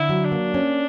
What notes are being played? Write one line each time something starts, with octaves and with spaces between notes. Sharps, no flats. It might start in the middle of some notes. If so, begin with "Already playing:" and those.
Already playing: D3 E4
F#3
D4
A#3
C#4